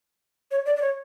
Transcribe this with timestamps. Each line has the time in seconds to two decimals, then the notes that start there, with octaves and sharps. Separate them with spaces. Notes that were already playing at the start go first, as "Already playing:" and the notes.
0.51 C#5
0.66 D5
0.76 D5
0.82 C#5